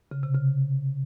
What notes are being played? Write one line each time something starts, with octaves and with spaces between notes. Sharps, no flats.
C#3
C3
C#3